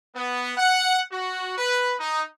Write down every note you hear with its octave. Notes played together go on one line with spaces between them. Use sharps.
B3
F#5
F#4
B4
D#4